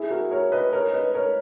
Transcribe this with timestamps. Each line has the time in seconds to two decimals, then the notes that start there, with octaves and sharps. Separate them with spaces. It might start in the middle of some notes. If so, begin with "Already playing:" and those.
Already playing: E4 G#4
0.10 F#4 A#4
0.31 A#4 C#5
0.52 B4 D#5
0.73 A#4 C#5
0.93 B4 D#5
1.14 A#4 C#5